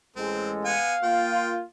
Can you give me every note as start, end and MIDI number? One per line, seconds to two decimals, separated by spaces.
0.16 0.76 33
0.16 0.76 56
0.16 0.51 60
0.16 0.76 69
0.65 0.95 59
0.65 1.46 77
0.65 0.95 80
1.03 1.62 58
1.03 1.62 65
1.03 1.56 79